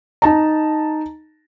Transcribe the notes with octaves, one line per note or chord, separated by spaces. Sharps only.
D#4 A5 A#5